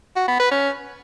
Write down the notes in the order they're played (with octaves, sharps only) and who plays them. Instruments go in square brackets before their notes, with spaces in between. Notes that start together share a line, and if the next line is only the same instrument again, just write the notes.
[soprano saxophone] F#4
B3
B4
C#4